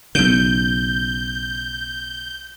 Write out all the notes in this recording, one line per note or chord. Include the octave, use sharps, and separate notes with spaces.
B1 C#3 G6